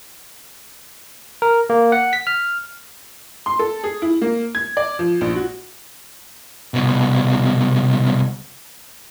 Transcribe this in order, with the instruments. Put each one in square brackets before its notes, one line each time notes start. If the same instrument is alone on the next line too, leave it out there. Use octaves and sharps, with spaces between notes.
[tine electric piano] A#4
A#3
F#5
B6
F6
[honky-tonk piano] C6
A4
G#4
E4
A#3
G#6
D5
F3
A#1
F#4
[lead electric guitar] C2 B2